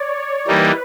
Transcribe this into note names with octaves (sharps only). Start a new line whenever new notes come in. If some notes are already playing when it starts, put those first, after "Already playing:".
Already playing: C#5 D5
E3 G3 A#3 D#4 B4